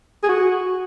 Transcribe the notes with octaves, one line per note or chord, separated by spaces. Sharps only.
G#4
F#4